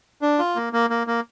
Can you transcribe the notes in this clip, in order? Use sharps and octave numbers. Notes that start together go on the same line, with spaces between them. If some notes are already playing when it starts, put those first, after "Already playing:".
D4
F4
A#3
A#3
A#3
A#3